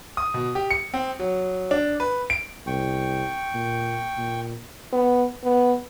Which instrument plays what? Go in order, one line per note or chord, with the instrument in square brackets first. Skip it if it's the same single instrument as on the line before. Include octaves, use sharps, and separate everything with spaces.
[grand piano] D#6
B2
G4
C#7
C4
F#3
D4
B4
D7
[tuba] C2 [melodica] G5 C#6
[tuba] A#2
A#2
[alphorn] B3
B3